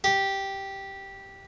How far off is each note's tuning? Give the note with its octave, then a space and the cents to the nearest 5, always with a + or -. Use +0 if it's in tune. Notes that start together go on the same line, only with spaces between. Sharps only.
G4 -5